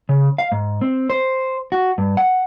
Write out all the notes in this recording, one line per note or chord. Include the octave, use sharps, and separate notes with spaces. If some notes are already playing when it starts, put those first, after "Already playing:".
C#3
F5
G#2
C4
C5
F#4
G2
F#5